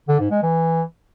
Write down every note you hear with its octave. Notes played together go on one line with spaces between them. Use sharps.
D3
G#2
G#3
E3